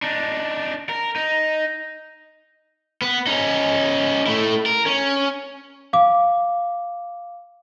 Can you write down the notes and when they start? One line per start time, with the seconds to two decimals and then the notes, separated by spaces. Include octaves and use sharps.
0.02 D4 D#4
0.89 A#4
1.16 D#4
3.02 B3
3.26 C#4 D#4
4.26 A3 E4
4.66 A#4
4.86 C#4
5.93 F5 D6